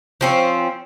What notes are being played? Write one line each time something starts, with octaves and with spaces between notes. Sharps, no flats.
F3 C4 C#4